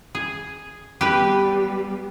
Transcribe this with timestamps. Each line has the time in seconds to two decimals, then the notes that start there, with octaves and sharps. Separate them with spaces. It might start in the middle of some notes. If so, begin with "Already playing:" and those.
0.15 G#4
1.01 G3 B3 G4 B4